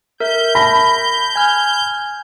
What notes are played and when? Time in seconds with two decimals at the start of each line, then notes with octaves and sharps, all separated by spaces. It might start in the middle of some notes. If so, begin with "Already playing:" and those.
0.20 A#4 E5 G6
0.55 A5 B5 A#6 B6
1.35 G#5 F6 G#6